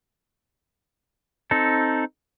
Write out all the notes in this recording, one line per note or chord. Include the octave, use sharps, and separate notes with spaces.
C4 D#4 A4